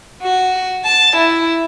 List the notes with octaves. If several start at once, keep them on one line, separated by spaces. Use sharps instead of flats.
F#4
A5
E4